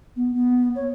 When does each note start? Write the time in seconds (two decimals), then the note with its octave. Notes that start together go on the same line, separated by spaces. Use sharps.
0.16 B3
0.34 B3
0.75 C#5